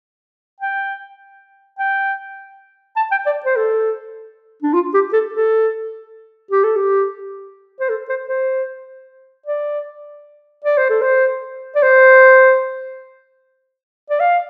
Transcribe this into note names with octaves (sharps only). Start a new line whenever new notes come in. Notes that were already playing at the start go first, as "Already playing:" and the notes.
G5
G5
A5
G5
D5
C5
A4
D4
F4
G4
A4
A4
G4
A4
G4
C5
A4
C5
C5
D5
D5
C5
A4
C5
D5
C5
D5
F5